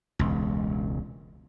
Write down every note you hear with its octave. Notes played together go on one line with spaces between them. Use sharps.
E1 C#2